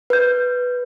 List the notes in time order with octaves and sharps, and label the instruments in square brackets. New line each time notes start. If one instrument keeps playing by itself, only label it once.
[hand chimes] B4 G6